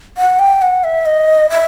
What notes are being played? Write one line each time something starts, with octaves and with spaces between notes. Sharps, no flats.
F#5
G5
F#5
E5
D#5
E5